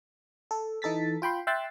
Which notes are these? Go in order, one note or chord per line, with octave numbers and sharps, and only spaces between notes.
A4
E3 D#4 A4 A6 B6
F4 G5 B5 C6
E5 G5 C6 E6 F#6 A6